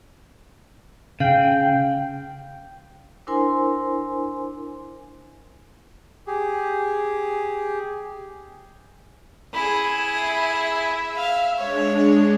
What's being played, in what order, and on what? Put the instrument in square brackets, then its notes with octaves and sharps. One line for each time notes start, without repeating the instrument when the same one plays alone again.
[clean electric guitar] C#3 [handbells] F5 [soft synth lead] G5
[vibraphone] D4 E4 A#4 C5 G#5 C6
[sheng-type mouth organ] G4 G#4
[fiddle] E4 G#4
[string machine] E5
[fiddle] F5
[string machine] G#3 D4 [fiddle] C#5